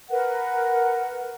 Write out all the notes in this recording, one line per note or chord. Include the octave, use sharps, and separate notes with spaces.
A#4 B4 F#5